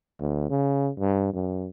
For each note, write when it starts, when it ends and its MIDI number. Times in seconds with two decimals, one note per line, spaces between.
0.20 0.49 38
0.50 0.90 49
0.99 1.32 43
1.33 1.68 42